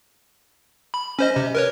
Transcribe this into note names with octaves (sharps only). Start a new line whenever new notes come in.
B5
C#4 C5 D#5
C3
A#4 B4 C#5